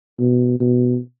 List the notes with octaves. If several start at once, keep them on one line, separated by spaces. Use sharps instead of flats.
B2
B2